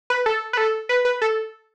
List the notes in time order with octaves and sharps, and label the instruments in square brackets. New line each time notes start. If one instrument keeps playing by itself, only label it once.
[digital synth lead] B4
A4
B4
A4
B4
B4
A4